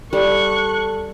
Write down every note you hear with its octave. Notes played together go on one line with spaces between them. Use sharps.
G3 A4 C#6 F#6